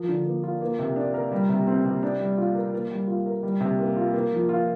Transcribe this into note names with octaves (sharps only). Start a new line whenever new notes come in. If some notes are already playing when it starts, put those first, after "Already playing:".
Already playing: F3 A#4
D3
A#3
F4
A#3
C3
D4
A#4
G3
C3
C4
C3
D4
G3
F4
A#4
A#3
G3
F4
A#4
G3
C3
A#3
F4
A#3
F3
F4